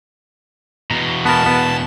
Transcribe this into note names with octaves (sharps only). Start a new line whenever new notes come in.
E2 B2 A#5
B3 A#4 A5
B3